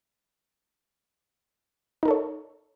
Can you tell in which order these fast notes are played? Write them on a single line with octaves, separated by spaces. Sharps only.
D#4 A#4 A4 C#5